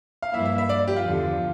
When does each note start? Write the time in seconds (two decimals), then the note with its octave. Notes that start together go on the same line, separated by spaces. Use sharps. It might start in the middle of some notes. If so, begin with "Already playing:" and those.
0.22 F5
0.34 G2 F3 A#3 E4 E5
0.45 E5
0.58 E5
0.69 D5
0.88 G4
0.96 F4
1.05 E2 D3 F3